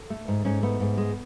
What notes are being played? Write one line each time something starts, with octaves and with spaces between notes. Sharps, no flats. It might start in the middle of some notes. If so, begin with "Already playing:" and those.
Already playing: A4
A3
G#2
G#2 C#4
A3 B3
G#2
G#3